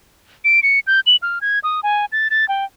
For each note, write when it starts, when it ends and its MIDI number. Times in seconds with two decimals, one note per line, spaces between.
0.45 0.60 98
0.63 0.80 97
0.87 1.00 91
1.07 1.16 102
1.22 1.39 89
1.41 1.59 92
1.64 1.80 87
1.83 2.05 80
2.12 2.28 93
2.30 2.47 93
2.49 2.65 79